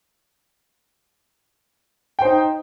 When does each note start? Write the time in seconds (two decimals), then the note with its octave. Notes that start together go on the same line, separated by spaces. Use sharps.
2.19 G5
2.22 C5
2.25 D#4